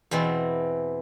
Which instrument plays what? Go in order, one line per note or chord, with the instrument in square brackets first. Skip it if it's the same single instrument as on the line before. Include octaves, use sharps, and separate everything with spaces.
[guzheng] E2 B2 E3 C4